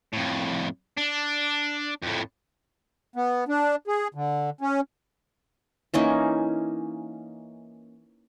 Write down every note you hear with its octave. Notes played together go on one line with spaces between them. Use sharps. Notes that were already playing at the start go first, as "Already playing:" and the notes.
F2 A2
D4
F2 A2
B3
D4
G#4
D3
C#4
E3 A#3 C#4 D#4